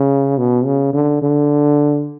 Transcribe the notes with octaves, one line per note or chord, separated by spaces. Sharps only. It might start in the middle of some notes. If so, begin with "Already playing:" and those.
Already playing: C#3
B2
C#3
D3
D3